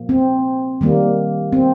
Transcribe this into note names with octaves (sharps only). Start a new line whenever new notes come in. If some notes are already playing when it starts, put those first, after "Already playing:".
Already playing: A#2 F3 A#3
C4
D#3 G3 A#3
C4